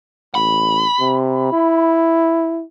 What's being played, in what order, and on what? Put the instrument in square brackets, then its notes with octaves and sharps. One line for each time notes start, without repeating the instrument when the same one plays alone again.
[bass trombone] A1 [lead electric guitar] B5
[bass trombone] C3
E4